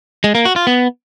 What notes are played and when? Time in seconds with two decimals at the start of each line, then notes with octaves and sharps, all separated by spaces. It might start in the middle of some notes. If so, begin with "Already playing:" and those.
0.24 G#3
0.35 A#3
0.45 F#4
0.56 F4
0.67 B3